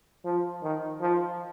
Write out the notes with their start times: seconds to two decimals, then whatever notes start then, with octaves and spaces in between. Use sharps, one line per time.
0.25 F3
0.63 D#3
1.01 F3